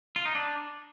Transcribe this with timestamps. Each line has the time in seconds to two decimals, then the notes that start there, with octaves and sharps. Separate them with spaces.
0.16 F4
0.25 D#4
0.35 D4